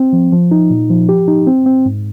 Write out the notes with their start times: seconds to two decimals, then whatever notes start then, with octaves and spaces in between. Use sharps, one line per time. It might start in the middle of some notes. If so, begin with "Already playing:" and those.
Already playing: C4
0.13 F3
0.32 F3
0.51 D#4
0.70 A#2
0.90 F3
1.09 G4
1.28 D#4
1.47 C4
1.66 C4
1.86 G#2